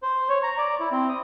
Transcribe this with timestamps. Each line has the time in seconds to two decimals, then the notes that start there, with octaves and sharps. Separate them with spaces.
0.03 C5
0.29 C#5
0.43 A#5
0.58 D5
0.80 E4
0.92 C4
1.09 D#6